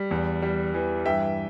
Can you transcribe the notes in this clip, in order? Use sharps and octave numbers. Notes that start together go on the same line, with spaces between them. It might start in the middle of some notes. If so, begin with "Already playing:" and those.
Already playing: G3
E2
G3
E3
G2 E5 G5